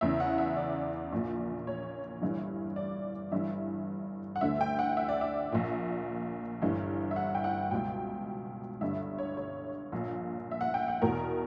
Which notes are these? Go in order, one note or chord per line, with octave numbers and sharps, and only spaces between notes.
E2 C#3 E3 E5
F#5
E5
D5
A#1 A#2
C#5
G1 G2 E3
D5
G1 G2 E3 E5
F#5
D2 D3 E5
G5
F#5
E5
D5
E5
A#1 A#2
G1 G2 E3
E5
F#5
G5
F#5
C#2 B2 G5
G1 G2 D3 E5
C#5
C#5
A#1 A#2
E5
F#5
G5
F#5
E2 B2 A#4